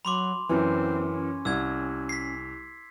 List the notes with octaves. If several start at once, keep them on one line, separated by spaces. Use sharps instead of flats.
F#3 B5 C6 D6
F#2 E3 C4
C#4
C2 E6 G#6
B6 C7